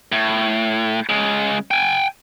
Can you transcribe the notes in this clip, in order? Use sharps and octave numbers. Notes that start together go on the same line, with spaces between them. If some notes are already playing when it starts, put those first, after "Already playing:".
A2
C#3 G#3
G5 G#5